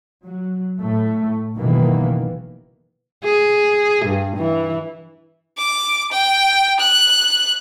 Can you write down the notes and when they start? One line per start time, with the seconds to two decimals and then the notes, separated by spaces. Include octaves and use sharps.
0.24 F#3
0.79 A2 A3
1.56 F#1 B1 D#3 E3 A#3 B3
3.24 G#4
4.05 G2
4.37 E3
5.58 D6
6.12 G5
6.79 F#6